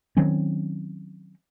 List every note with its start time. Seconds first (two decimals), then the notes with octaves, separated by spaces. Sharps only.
0.17 D#3 F#3 C4 C#4